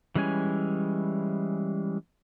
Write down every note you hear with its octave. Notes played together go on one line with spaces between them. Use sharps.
E3 G3 G#3 C#4 G#5